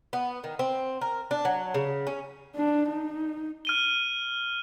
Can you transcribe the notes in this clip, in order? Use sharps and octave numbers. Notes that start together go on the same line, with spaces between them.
B3
D#3
C4
A#4
D4
F#3
C#3
C#4
D4
D#4
F6 D#7 G7